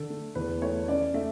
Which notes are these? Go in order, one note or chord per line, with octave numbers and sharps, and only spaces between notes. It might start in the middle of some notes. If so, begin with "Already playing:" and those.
Already playing: D3 A4
A3
E2 B4
A3 C#5
C#4 D5
A3 E5